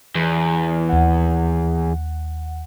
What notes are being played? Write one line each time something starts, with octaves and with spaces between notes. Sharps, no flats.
E2
D#2 F#5